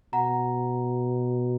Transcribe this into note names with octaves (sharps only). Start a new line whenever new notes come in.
B2 F#5 A#5